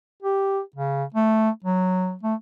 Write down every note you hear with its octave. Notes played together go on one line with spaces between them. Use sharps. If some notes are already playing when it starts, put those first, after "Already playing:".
G4
C#3
A3
F#3
A3